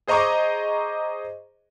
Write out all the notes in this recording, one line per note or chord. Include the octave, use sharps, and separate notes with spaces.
G#4 C5 D#5 A#5 C#6 D6